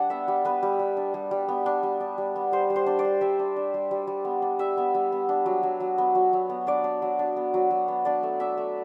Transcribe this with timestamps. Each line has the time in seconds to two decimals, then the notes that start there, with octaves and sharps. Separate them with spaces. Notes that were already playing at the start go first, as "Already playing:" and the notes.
Already playing: G3 D4 F#5
0.10 B3 E5
0.28 G3
0.45 B3 B4
0.63 G3
0.79 G3
0.97 D4
1.14 G3
1.31 G3
1.48 B3
1.66 D4
1.83 G3
2.01 D4
2.18 G3
2.36 B3
2.52 G3 C5
2.70 G3
2.76 C5
2.86 D4
2.99 D5
3.05 D4
3.21 G3 E5
3.39 D4
3.56 D4
3.74 G3
3.91 G3
4.07 G3
4.25 B3
4.42 D4
4.59 G3 E5
4.77 B3
4.95 G3
5.12 B3
5.29 D4
5.46 F#3
5.63 F#3
5.80 F#3
5.98 B3
6.15 F#3
6.33 F#3
6.49 B3
6.67 D4 D5
6.84 D4
7.02 F#3
7.19 D4
7.36 B3
7.54 F#3
7.71 F#3
7.88 B3
8.05 D4 D5
8.23 A3
8.40 D4 E5
8.57 A3